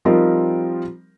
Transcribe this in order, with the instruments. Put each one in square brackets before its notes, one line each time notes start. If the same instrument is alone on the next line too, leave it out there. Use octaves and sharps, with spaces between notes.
[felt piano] F3 G3 C4 D#4 F4 A#4